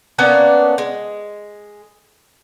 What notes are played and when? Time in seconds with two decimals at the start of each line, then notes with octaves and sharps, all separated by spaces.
0.18 A#3 B3 C#4 D4
0.78 G#3